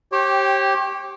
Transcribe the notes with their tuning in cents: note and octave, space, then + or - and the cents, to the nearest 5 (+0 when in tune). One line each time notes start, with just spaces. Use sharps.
G4 -10 C#5 -40 G5 +0